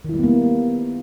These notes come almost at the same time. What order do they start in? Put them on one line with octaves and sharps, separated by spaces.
D#3 E4 G3 B3 A#3